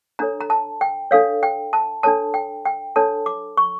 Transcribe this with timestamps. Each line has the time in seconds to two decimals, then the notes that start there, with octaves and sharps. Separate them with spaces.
0.19 D4 A4 C#5 A#5
0.41 A#5
0.50 A5
0.81 G5
1.11 D4 A4 C#5 F5
1.43 G5
1.73 A5
2.03 D4 A4 C#5 A5
2.34 G5
2.65 G5
2.96 D4 A4 C#5 A5
3.26 D6
3.57 C#6